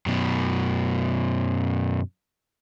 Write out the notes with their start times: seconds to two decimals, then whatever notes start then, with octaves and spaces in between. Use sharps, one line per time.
0.06 F#2 B2